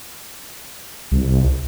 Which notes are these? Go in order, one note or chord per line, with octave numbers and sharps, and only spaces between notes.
C2